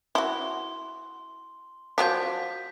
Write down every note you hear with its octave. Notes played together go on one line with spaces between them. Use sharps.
E4 F#4 C6
F3 F#3 D4 G6 B6